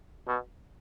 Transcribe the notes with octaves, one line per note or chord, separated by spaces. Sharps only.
B2